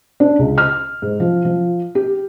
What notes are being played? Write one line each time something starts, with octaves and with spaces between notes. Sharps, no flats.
D4
C#2
F6
G#2
F3
F3
G4